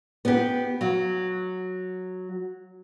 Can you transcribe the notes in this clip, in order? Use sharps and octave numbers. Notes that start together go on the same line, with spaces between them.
B3 G4
F#3